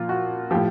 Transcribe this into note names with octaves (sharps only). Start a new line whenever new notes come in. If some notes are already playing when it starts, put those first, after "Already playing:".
Already playing: A#2 F3 F4
F#4
A2 F3 G4